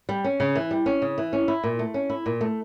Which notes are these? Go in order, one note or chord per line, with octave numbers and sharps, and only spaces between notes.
G3
C#4
C#3
E3
G3
C#4
C#3
E3
C#4
E4
A#2
A3
C#4
E4
A#2
A3